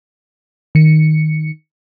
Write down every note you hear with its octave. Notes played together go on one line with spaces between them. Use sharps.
D#3 C#7